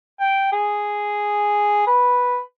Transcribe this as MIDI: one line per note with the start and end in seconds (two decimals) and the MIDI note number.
0.20 0.50 79
0.52 1.82 68
1.87 2.40 71